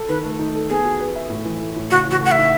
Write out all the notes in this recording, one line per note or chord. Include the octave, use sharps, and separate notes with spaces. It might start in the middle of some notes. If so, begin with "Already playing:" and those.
Already playing: A4
D#3 B4
A3
D#4
A4
B3 G#4
F#4
B4
E5
A2
E3
A3
A2
C#3 F#4
E3 F#4
A3 F#5
D#4 E5